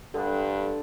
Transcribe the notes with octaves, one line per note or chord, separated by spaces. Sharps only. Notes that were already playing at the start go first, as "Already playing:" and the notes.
G2 D3 G3 D4 A4